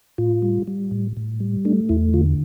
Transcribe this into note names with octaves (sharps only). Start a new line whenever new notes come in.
A2 F4
G3
G3
A2
A2
G3
A3 D4
E2 E4
D3 F4